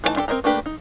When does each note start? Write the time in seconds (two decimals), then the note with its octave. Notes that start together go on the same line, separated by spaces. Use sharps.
0.04 E3 A3 D4 D#4 A5
0.16 D4 F4 G4 A4
0.28 C4 A#4 C5 D#5 A#5
0.44 A3 A#3 D4 G4 B4
0.66 D#4